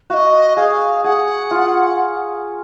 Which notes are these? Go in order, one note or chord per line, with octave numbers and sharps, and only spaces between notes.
F#4 D#5 F5
G#4 F5
G#4 F#5
F4